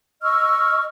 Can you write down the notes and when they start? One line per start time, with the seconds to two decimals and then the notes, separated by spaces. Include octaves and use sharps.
0.22 D#5 C#6 E6 F6